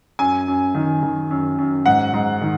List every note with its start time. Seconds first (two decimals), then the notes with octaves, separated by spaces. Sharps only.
0.19 F#2 G#5
0.48 F#2
0.75 D#3
1.03 D#3
1.31 F#2
1.58 F#2
1.86 G#2 F#5
2.13 G#2
2.41 D#3